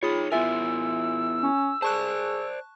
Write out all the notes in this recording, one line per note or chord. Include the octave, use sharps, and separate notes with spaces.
D#4 F4 G#4 C#5 B5 D#6
B3 E4 F4 A#4 E5 G#5 E6
C#4
G#4 C5 D5 A5 C#6 F#6